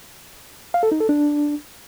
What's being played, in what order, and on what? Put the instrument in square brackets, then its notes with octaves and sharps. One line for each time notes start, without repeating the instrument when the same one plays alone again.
[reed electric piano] F5
A4
D#4
A4
D4